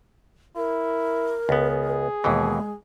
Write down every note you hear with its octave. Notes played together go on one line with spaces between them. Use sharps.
E4 A#4
C#2 B3 G#4
D#2 B2 E3 G#3